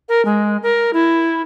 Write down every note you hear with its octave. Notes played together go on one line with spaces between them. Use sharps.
A#4
G#3
A#4
E4